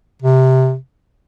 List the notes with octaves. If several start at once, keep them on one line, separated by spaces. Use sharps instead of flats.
C3